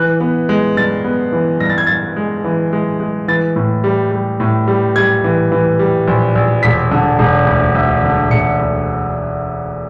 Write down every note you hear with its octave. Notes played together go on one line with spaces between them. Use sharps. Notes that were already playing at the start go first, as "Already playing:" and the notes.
Already playing: E3 F#6
B3
G#3
G2 A6
B3
E3
G2 A#6
A6
G#6
G2 A6
G#3
E3
G#3
G#3
E3 A6
A2
G3
G3
A2
G3
G3 G#6
E3
E3
G3
A#1
A#1
E1 B6
D3
E1
D2
D2
D3
E1 C#7
D2